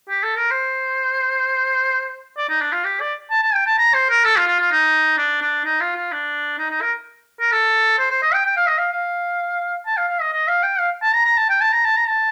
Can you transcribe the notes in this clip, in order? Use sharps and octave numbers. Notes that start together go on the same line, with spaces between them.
G4
A4
A#4
C5
D5
D#4
D4
F4
G4
D5
A5
A5
G5
A5
A#5
C5
A#4
A4
F4
F4
F4
D#4
D4
D4
D#4
F4
F4
D4
D#4
D#4
A#4
A#4
A4
C5
C5
D#5
G5
G5
F5
D#5
F5
F5
A5
F5
F5
D#5
D#5
F5
G5
F5
A5
A#5
A#5
A5
G5
A5
A#5
A5
A#5
A5